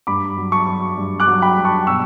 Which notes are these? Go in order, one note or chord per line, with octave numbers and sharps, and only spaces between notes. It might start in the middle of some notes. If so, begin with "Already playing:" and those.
G2 B5 D6
F#3
A5 C#6
F#3
G2
D6 F#6
F#3
G5 B5
G2
A5 C#6
B2 C#6 E6